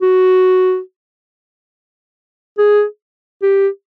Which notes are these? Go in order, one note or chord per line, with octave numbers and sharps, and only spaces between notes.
F#4
G#4
G4